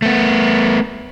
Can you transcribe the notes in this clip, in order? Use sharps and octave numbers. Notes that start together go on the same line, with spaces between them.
A3 B3